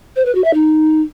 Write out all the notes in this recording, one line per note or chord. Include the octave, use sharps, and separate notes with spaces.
C5
B4
F#4
E5
D#4